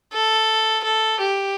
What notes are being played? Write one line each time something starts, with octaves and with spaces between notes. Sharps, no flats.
A4
A4
G4